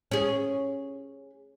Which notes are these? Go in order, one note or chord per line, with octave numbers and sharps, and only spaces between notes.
C#4 G#4